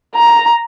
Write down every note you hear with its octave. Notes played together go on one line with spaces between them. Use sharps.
A#5